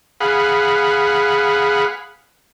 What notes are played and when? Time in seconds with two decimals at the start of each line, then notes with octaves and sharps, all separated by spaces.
0.21 G#4 F5 F#5 B5